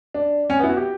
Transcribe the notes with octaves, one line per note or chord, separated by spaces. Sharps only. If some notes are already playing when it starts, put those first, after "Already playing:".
D4
C#4
B3
E4
F#4
G4